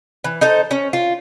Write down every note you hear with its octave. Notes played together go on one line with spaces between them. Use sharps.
E3
D#4 A4 C5
C#4
F4